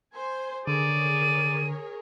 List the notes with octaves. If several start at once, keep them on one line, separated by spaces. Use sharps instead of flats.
C5 G#5 C6
D3 G#4 A#4 C#5 D5 D#7